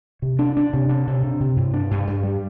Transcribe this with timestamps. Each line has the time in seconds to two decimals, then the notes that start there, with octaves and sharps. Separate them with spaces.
0.22 C3
0.39 D4
0.57 D4
0.73 C3
0.89 D4
1.07 C3
1.23 C3
1.40 C3
1.56 G2
1.74 D4
1.91 G2
2.07 G2
2.23 G3